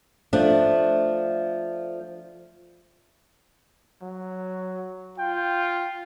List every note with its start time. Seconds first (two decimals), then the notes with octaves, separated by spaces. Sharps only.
0.33 F3 A3 D4
4.02 F#3
5.18 F4 G5